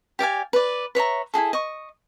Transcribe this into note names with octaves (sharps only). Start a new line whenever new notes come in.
G4 D5 F5 G#5
B4 D5
B4 C#5 E5 A#5
E4 F#4 G#4 A4
D#5 C#6